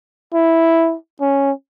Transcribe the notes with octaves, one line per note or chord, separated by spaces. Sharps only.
E4
C#4